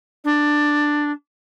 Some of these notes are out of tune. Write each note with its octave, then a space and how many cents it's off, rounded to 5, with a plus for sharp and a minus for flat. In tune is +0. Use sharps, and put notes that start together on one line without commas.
D4 +10